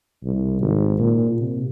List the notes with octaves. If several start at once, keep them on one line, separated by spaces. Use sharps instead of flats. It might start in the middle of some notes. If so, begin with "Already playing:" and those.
C2
G#1
A#2
C3